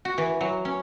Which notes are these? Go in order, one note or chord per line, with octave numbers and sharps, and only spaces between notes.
F#4
E3
F#3
C#4